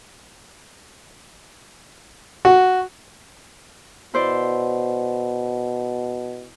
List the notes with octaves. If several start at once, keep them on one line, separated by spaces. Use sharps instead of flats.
F#4
B2 E4 C5 D5